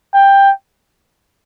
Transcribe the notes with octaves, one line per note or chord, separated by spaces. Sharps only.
G5